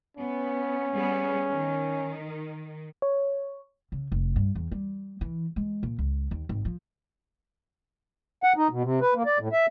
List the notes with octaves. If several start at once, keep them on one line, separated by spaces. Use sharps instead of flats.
B3 C#4
G3 B3 G#4
D#3
C#5
C#3
F1
G2
E2
G3
E3
G#3
A#2
C#2
D#2
G#1
F3
F#5
D#4
B2
C3
B4
A#3
D5
A2
E5